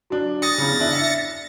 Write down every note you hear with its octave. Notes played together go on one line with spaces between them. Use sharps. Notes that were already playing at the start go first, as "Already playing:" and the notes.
F#3 D4
D#6 A6 A#6 C#7
E2 C#3
D4 E4
E5